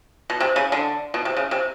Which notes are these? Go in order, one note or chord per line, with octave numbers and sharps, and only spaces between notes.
B2
C3
C#3
D3
B2
C3
C#3
C3